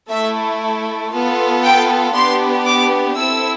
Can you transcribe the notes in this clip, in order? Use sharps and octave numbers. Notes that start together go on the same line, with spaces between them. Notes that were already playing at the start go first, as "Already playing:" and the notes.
A3 E4 A4 E5
B3 F4 A4
G5
B3 D4 G4 C6
D6
C4 E4 A4 E6